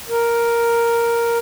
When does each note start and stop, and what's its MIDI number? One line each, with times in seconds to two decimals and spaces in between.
0.09 1.39 70